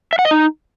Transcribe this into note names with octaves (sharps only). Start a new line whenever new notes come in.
E5
F#5
D#5
D#4